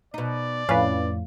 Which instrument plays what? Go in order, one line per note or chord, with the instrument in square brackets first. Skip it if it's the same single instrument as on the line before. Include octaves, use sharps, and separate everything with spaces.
[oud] B2 D#4 [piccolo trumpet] D5
[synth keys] F2 A2 [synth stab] C#4 B4 [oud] F5